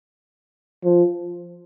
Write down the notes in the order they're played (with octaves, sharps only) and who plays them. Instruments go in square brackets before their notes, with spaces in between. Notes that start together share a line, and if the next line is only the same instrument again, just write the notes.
[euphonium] F3